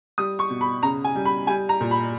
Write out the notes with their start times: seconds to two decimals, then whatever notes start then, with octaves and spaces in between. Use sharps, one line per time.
0.18 G3 D#6
0.39 C#6
0.50 B2
0.61 B5
0.83 C#3 A#5
1.04 G#5
1.16 G3
1.25 B5
1.47 G3 G#5
1.69 A#5
1.81 A#2
1.91 B5